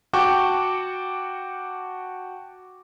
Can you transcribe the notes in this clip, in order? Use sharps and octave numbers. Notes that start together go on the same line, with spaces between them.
F#4 F#5 G5 A5 C#6 D6